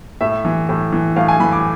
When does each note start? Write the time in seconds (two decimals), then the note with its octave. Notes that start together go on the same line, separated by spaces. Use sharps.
0.21 A2 E5
0.45 E3
0.69 A2
0.92 E3
1.16 A2 F5
1.28 G#5
1.40 E3 B5
1.52 D6